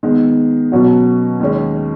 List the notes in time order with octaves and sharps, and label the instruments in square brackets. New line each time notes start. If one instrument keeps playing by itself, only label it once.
[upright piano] D#3 G#3 B3
B2 F#3 C#4 F#4
D#2 D#3 G#3 C#4